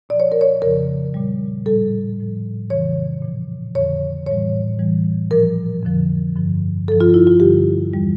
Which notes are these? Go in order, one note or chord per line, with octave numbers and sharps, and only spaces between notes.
A#2 F3 D5
C#5
A#4
C#5
F2 C#3 F3 A#4
A#2 G3
A2 G3 A4
A2 F3
F2 C#3 E3 C#5
A#2 F3
F2 D3 F3 C#5
A2 E3 G3 C#5
A2 E3 G3
A#2 F3 A#4
F2 D3 F3
G2 D3 F3
G2 F3 A4
F4
E4
F4
G2 D3 G3 G4
E2 E3 G3